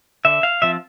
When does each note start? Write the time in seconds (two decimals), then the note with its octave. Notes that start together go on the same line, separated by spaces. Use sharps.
0.25 D3 E5
0.43 F5
0.62 F3 C4 F4 E5